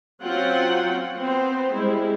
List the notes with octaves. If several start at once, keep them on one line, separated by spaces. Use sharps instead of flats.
F#3 C4 C#4 F4 F#5 G5
B3 C4 C5
G3 G#3 E4